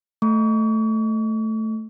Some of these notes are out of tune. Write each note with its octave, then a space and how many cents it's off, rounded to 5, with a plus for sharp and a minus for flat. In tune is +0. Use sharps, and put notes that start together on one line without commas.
A3 +0 C#6 +40